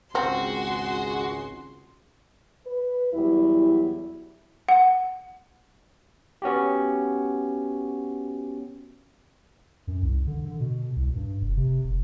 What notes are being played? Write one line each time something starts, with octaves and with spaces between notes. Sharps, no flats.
G#1 C#2 C4 F#4 G#4 C6
B4
E2 F#3 G3 E4
F#5
B3 C#4 F#4 G4
F#2
C2
D3
D3
B2
C2
G2
F1
C3
F1